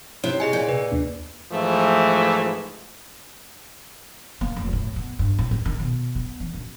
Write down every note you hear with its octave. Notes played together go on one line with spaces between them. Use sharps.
C3 D#4 E4 C#5
G#4 D#5 G#5
A#2
C3 B4
D#2 A#3 D4
G#2 E3 F3 A3
A#3
F1
A2
B3
G2
A2
C2
D#3
B2
B3
E3
F#2